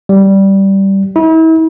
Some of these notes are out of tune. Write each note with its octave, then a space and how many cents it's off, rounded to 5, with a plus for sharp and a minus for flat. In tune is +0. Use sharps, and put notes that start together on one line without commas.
G3 -10
E4 -40